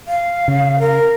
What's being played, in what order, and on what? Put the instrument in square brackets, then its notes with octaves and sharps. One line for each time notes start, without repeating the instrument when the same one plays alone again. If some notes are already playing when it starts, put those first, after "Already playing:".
[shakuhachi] F5
[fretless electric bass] C#3
[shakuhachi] A#4